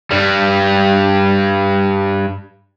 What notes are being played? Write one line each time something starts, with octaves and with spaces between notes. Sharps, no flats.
G2 G3